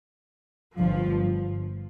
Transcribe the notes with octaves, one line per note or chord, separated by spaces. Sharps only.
G1 G2 F3